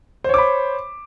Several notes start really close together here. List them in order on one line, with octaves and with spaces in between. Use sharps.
C5 C#5 D6 B5